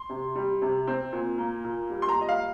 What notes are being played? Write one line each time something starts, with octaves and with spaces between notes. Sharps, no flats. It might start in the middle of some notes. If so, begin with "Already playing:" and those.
Already playing: C6
C3
G3
C3
C4
A#2
A#3
A#2
G3
C6
A#5
A#2
D#5
F5